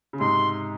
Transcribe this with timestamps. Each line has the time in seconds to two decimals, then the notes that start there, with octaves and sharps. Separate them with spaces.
0.13 C#3
0.19 G#2 C3 C6